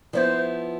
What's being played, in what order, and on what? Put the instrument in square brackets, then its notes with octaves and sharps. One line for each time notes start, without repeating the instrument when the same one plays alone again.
[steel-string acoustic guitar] F3 B3 E4 [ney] C5 D5